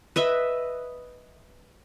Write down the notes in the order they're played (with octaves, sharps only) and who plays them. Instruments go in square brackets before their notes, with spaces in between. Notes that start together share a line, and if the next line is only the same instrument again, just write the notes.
[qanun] B4 D#5 E5